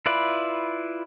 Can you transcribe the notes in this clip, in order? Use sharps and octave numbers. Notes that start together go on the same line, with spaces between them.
E4 F4 B4 D5